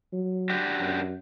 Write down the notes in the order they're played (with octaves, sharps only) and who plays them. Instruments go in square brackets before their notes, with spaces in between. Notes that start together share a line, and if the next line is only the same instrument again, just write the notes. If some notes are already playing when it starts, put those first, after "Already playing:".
[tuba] F#3
[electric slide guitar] D4 F#4 G4
[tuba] F#2